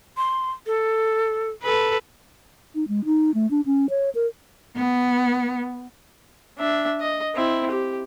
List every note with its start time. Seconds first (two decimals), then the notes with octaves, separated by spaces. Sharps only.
0.17 C6
0.67 A4
1.63 A4 B4
2.75 D#4
2.88 G#3
3.05 D#4
3.34 A3
3.51 D4
3.66 C#4
3.89 C#5
4.15 A#4
4.76 B3
6.58 D4 E5
7.01 D#5
7.35 C4 E4
7.71 G4